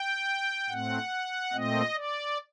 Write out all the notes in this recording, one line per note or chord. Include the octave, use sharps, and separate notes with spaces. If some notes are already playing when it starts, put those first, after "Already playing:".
Already playing: G5
A2 A3 C4 F#5
A#2 A3 C4 D#5
D5